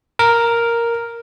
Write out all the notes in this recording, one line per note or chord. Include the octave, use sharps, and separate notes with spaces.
A#4